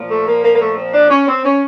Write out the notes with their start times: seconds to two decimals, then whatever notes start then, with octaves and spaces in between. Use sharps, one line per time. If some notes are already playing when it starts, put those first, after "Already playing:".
Already playing: A#2 F3
0.09 A3
0.25 A#3
0.43 A#3
0.54 A#3
0.59 A3
0.76 C4
0.92 D4
1.09 C#4
1.27 C4
1.43 C#4